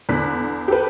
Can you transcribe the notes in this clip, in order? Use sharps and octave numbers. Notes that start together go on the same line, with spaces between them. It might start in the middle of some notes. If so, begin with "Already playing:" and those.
E2 D3 F#6 B6
G4 A4 B4